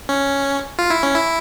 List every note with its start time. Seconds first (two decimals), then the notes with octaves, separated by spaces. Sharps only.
0.09 C#4
0.79 F4
0.91 E4
1.03 C#4
1.15 E4